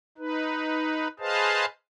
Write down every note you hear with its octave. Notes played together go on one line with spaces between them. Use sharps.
D#4 B4
G#4 B4 C5 D#5 F5 A5